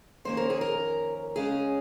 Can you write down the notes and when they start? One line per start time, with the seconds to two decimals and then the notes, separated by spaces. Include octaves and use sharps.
0.25 F2 D#3 A#3 C#4 C5
0.37 A#4
0.50 G#4
0.61 A#4
1.36 C#3 G#3 C#4 G#4